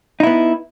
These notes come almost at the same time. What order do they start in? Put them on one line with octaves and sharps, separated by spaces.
D#4 E4 B3